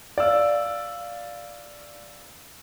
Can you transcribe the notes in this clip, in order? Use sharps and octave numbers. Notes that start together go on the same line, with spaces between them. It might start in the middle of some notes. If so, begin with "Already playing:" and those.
D5 F5 E6